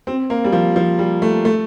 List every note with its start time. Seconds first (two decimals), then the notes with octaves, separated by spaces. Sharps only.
0.07 C4
0.30 A#3
0.44 G3
0.52 F3
0.76 F3
0.99 G3
1.22 A3
1.45 A3